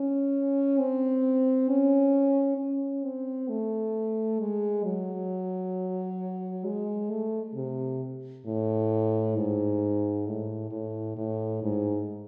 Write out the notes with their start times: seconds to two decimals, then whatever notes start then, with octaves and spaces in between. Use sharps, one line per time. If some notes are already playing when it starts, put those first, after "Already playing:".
Already playing: C#4
0.78 C4
1.69 C#4
2.58 C#4
3.04 C4
3.49 A3
4.40 G#3
4.84 F#3
6.65 G#3
7.10 A3
7.55 C3
8.46 A2
9.36 G#2
10.27 A2
10.71 A2
11.17 A2
11.63 G#2